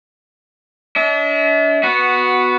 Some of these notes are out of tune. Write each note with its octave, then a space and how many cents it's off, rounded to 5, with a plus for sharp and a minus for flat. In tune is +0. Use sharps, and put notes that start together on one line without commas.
D4 -40 E5 -45
B3 +0 F#4 -5